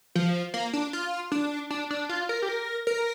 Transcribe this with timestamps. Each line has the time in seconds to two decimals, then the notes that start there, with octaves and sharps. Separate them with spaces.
0.15 F3
0.54 A#3
0.73 D4
0.93 F4
1.32 D4
1.70 D4
1.91 D4
2.09 F4
2.29 A#4
2.42 G4
2.49 A#4
2.87 A#4